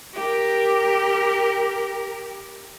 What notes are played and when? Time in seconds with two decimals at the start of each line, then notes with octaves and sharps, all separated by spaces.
0.14 G4 A#4